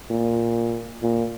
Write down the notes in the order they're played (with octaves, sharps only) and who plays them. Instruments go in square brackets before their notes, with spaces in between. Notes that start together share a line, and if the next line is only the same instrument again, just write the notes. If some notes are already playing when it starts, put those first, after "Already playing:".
[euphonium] A#2
A#2